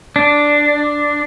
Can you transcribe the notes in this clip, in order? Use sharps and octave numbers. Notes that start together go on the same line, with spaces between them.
D4